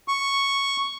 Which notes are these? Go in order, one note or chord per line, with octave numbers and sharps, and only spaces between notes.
C#6